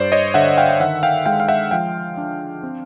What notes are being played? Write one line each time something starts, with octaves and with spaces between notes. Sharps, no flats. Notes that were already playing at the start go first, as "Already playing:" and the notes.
Already playing: G2 C5 D5
C#5 D#5
D3 E5 F#5
F5 G5
G5
D#3 E5 F#5
F5 G5
G#3 F5 G5
F5
E5 F#5
F3 F5 G5
D4
C4